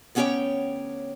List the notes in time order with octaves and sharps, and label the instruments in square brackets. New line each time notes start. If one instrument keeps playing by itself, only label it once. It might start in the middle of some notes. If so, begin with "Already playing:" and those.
[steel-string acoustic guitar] D2 B3 C#4 G4 C#5 G5